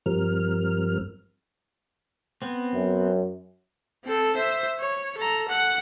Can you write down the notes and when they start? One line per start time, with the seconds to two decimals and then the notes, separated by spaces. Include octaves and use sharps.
0.06 G2 F3 G3 C4 A#4 F6
2.42 B3 C4
2.75 F#2
4.04 C4 A4
4.36 C5 E5
4.80 C#5
5.17 A4 A#5
5.48 F#5 F#6